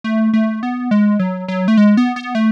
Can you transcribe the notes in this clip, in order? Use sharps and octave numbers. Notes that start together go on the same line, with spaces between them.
A3
A3
B3
G#3
F#3
F#3
A3
G#3
B3
B3
A3